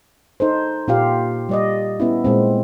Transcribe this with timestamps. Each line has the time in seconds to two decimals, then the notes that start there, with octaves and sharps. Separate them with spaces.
0.40 D#4 A4 C5
0.88 A#2 F4 G4 F5
1.49 G3 D5 D#5
2.00 B3 C#4 E4
2.24 A#2 G#3 C4